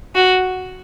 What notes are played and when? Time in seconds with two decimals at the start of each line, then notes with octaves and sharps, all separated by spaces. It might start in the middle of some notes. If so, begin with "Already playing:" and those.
0.15 F#4